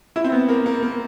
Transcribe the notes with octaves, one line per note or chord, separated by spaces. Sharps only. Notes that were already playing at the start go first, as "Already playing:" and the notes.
E4
C4
B3
A#3
A#3
A#3